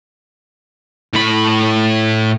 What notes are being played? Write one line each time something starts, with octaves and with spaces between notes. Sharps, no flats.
A2 B5